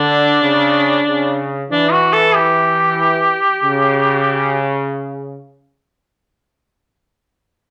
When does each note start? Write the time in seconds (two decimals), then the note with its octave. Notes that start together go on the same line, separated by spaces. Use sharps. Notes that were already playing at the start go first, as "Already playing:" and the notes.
Already playing: D3 D4
0.42 C#3
1.06 C#3
1.70 E3 D4
1.92 F#4
2.13 A4
2.35 G4
3.63 C#3